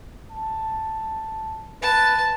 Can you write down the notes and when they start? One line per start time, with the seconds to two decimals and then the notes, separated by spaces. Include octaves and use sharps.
0.31 A5
1.83 B4 A5